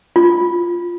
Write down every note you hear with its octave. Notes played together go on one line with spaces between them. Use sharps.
F4